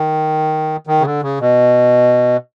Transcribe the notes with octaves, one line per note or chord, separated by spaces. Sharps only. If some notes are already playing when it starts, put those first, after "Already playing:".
Already playing: D#3
D#3
C#3
D3
C#3
B2